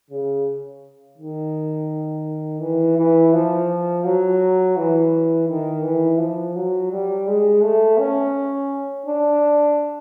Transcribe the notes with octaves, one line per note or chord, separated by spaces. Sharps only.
C#3
D#3
E3
E3
F3
F#3
E3
D#3
E3
F3
F#3
G3
G#3
A3
C#4
D4